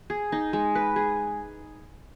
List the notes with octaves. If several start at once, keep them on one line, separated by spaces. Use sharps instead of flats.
G#4
D#4
G#3
B4
G#4